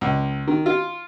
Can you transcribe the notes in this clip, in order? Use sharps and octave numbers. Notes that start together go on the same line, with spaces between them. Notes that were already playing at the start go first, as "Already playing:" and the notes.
C#2
D#3
F4